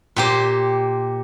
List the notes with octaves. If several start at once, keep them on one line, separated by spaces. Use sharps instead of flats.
A#2 G4 C5